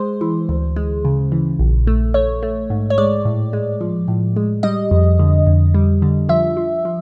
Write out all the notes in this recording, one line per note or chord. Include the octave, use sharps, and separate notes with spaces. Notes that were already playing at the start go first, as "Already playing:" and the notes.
Already playing: G#3 C5
E3
D2
G#3
C#3
E3
A#1
A3
A3 C#5
A3
G#2
C#5
G#3 D5
A2
G#3
F3
A2
G#3
G3 D#5
F2
D3
F2
G3
D3
F3 E5
F3
F3